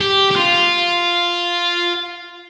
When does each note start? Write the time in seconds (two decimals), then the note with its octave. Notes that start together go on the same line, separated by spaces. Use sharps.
0.01 G4
0.31 G4
0.36 F4